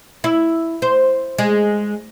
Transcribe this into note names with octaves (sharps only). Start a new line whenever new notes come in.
E4
C5
G#3